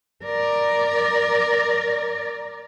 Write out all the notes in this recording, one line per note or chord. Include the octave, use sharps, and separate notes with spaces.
A#4 D5